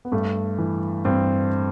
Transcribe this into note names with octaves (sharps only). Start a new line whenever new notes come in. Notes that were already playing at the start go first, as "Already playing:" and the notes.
B3
G2 A3
E3
G2 C4